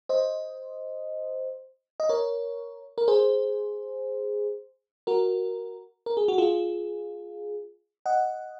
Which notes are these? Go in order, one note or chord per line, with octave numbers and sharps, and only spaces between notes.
C5 D#5
D#5
A#4 C#5
A#4
G#4 C5
F#4 A#4
A#4
G#4
F#4
F4 G#4
D#5 F#5